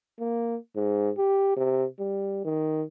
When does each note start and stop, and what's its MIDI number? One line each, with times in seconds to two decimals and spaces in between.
0.20 0.56 58
0.76 1.10 44
1.18 1.53 67
1.56 1.85 48
1.99 2.44 55
2.45 2.83 51